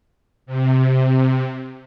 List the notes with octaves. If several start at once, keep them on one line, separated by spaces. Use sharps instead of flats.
C3